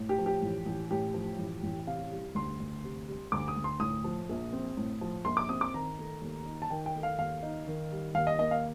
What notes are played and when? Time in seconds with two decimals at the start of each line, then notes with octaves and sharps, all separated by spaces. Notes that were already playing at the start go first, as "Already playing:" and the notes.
Already playing: A2
0.09 G4
0.18 F3
0.26 G4
0.42 A1
0.66 A1
0.91 A2 G4
1.14 F3
1.39 A1
1.63 A1
1.86 C3 F5
2.12 G3
2.35 D2 C6
2.60 D2
2.84 C3
3.08 G3
3.32 D2 D6
3.48 D#6
3.57 D2
3.64 C6
3.80 A2 D#6
4.04 F3
4.29 A#1
4.53 C4
4.77 A2
5.01 F3
5.25 A#1 C6
5.37 D6
5.49 C4 D#6
5.61 D6
5.74 D#3 A#5
5.98 A3
6.21 D#2
6.46 D#4
6.62 A5
6.70 D#3 G5
6.86 G5
6.95 A3
7.03 F5
7.18 D#2 F5
7.43 D#4
7.67 D#3
7.92 G3
8.15 D#2 F5
8.27 D#5
8.39 A#3 D#5
8.51 F5